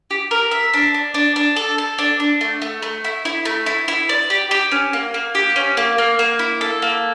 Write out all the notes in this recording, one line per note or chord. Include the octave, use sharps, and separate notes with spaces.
G4
A#4
E5
D4
D4
D4
D4
A4
A4
D4
D4
A3
A3
A3
E4
E4
A3
E4
E4
D5
G4
G4
C#4
A#3
A#3
G4
C#4
A#3
A#3
A#3
E4
A4
A#3